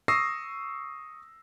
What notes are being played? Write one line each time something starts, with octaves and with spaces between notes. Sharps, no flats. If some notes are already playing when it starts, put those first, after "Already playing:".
C#6 D#6 E6 A#6 C7